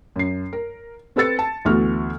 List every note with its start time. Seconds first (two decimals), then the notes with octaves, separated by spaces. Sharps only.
0.16 F#2 C7
0.53 A#4
1.16 C4 A4 B4 E6 A6 C#7
1.39 A5
1.65 D2 E3 A3 B3 F#4 F6